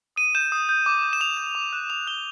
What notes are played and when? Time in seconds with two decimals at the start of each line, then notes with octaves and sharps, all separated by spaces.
0.16 D#6 D#7
0.35 G6 E7
0.52 D#6
0.69 G6
0.86 D6
1.03 G6
1.13 E7
1.21 D6 F7
1.37 G6
1.55 D6
1.73 F#6
1.90 D6 F7
2.07 F#6 G7